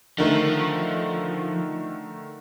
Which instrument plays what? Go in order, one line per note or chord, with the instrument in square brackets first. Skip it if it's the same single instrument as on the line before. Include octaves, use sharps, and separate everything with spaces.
[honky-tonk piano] D3 D#3 A3 [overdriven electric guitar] F3